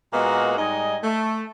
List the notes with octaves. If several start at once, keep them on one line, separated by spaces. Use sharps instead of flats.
A#2 G#3 A#3 B3 F#4 D#5
G#2 G3 D#4 D#5 G#5
A3